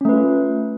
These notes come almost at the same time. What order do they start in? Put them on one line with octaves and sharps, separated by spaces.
C#4 A3 B4 F4